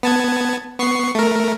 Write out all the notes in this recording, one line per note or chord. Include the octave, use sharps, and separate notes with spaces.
B3 A5 G#6
B3 C#6 C7
A3 A#4